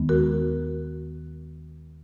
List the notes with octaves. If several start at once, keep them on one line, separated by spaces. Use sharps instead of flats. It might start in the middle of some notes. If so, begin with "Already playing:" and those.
Already playing: D#2 D#3 G#3 B3
F#4 A#4